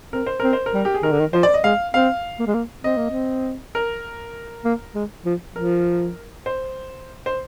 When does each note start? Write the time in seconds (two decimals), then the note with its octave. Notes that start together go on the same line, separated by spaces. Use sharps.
0.13 C4 A#4
0.26 C5
0.40 C4 A#4
0.53 C5
0.66 A#4
0.74 G3
0.85 G4
0.94 G#4
1.03 D#3 A#4
1.12 D3
1.20 D#3
1.33 F3 C5
1.43 D5
1.54 D#5
1.64 G#3 F5
1.94 C4 F5
2.39 A#3
2.46 G#3
2.54 A#3
2.84 C4 D#5
2.97 A#3
3.10 C4
3.75 A#4
4.65 A#3
4.95 G#3
5.25 F3
5.56 F3 A#4
6.46 C5
7.26 C5